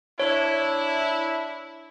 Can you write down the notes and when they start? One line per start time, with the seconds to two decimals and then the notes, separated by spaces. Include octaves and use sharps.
0.20 D4 E4 C#5